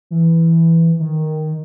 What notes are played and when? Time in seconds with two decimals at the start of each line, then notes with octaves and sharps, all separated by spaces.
0.11 E3
1.00 D#3